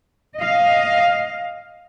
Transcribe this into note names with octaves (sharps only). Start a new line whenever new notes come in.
D#5 F5